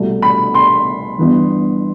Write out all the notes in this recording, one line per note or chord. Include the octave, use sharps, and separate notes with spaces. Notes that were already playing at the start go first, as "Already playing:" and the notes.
Already playing: C2 B2 A3
B5
C6
G1 G2 E3 B3